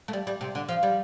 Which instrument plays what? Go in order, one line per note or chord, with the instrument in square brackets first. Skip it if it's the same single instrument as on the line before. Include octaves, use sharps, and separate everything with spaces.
[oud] A3
G3
G3
C3
D3
F3
G3